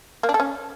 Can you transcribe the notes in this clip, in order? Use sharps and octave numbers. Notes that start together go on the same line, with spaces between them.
A#3
D4
A4
C#4